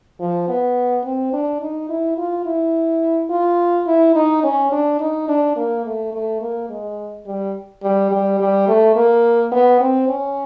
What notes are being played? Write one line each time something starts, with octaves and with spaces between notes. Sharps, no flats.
F3
B3
C4
D4
D#4
E4
F4
E4
F4
E4
D#4
C#4
D4
D#4
D4
A#3
A3
A3
A#3
G#3
G3
G3
G3
G3
A3
A#3
B3
C4
C#4